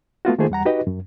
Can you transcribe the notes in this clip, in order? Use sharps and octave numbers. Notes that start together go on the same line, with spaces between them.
A3 B3 F4 F#4
D#3 A3 A#3 F4 G#4 C5
E2 G3 F#5 A#5
D#4 F#4 G4 B4 D#5
F#2